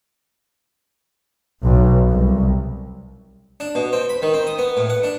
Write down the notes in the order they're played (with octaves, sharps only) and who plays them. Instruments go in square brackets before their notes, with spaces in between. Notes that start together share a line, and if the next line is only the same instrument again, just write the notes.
[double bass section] B1
C2
[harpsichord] D4
B2
C4
B5
D#3
C4
D#6
B3
A2
F#5
D4